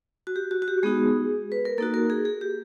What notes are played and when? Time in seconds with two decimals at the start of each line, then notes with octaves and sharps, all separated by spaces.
0.27 F#4
0.36 G4
0.51 F#4
0.62 F#4
0.68 G4
0.83 G#3 B3 D#4 F#4 G#4
1.52 B4
1.65 A#4
1.78 A#3 D#4 F#4 A4
1.94 A#4
2.10 G#4
2.25 G#4
2.41 G4